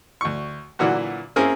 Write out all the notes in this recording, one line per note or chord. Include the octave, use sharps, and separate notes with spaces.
D2 C#6
A#2 D3 E3 F#3 F#4
A#3 C4 C#4 E4 G#4 A#4